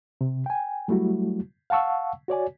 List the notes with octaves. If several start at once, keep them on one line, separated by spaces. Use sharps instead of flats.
C3
G5 G#5
F#3 G3 A3 E4 F#4
F5 F#5 A5 C#6 E6
F#4 C#5 D5 G#5